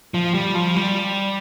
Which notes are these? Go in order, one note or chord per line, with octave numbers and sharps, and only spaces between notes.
F3
G3
F3
G3